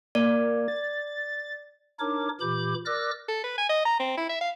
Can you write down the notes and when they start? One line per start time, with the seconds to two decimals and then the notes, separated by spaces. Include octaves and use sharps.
0.15 A#3 D5
0.68 A6
1.99 D4 D#4 A#4 C#5 D6
2.41 A#2 E3 G4 B5 D6 G6
2.86 A#4 D5 D6 E6 F#6 A#6
3.28 A4
3.43 B4
3.58 G#5
3.69 D#5
3.85 A#5
3.99 C4
4.17 E4
4.29 E5
4.41 F5